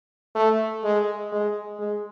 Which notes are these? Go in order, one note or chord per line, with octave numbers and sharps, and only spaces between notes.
A3
G#3
G#3
G#3